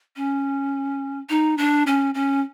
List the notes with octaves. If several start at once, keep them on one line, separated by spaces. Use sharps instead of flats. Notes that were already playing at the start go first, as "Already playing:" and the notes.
C#4
D#4
D4
C#4
C#4